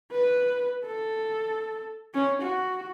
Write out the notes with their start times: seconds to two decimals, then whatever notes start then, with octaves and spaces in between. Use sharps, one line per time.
0.12 B4
0.86 A4
2.14 C#4
2.43 F#4